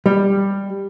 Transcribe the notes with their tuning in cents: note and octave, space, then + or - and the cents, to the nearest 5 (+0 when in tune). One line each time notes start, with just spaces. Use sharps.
G3 +10